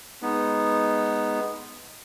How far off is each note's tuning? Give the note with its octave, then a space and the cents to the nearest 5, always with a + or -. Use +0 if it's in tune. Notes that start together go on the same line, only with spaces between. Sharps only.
G#3 +0 B3 +0 D#4 +0